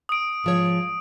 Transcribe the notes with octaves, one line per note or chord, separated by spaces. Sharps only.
D#6 D7
G#2 F3 C#5